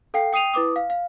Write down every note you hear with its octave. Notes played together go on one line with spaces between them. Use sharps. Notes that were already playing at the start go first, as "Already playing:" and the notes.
A4 F5 G5 C7
G5 D#6 C7 D#7 F7
E4 B4 D6 D#6
F5
F5